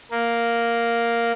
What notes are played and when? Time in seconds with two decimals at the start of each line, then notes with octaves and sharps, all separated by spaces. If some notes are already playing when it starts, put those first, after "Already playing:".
0.11 A#3